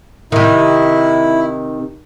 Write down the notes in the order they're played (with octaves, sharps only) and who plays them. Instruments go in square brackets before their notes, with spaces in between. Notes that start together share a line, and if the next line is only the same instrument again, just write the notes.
[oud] C3 D#3 [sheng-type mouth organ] E4